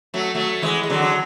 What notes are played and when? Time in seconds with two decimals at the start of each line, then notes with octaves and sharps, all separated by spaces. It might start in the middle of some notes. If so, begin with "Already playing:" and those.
0.14 F#3 A3
0.35 F#3 A3
0.62 E3 G#3
0.83 G#3
0.90 D3 F#3